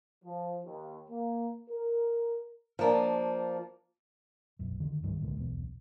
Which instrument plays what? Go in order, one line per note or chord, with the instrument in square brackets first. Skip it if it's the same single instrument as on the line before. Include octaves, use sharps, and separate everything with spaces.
[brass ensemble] F3
D#2
A#3
A#4
[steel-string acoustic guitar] F3 A#3 D4
[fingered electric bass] E1 B1 F#2
F2 D3 D#3
C2 G2 D#3 G3
C2 A#2 D3 G#3
D#1 B1 E2 B3